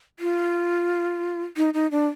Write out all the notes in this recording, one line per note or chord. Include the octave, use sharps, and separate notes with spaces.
F4
D#4
D#4
D4